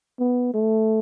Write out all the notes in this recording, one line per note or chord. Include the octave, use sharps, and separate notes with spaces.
B3
A3